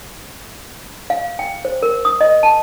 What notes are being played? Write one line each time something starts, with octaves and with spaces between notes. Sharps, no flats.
F5
G5
C5
A#4
D#6
D#5
A5